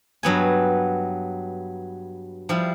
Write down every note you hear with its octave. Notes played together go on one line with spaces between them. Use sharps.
G2 F#3 B3 G#5
F3 G3 E4